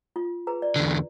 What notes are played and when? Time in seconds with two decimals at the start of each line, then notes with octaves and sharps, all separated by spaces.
0.16 F4
0.47 G#4 B4 A#5
0.62 D5
0.76 E2 D3